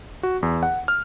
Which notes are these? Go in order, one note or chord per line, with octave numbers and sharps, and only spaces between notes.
F#4
E2
F#5
F6